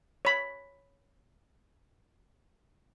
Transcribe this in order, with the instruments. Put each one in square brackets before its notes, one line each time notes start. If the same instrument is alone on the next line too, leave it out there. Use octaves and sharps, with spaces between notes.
[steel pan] C#5 B5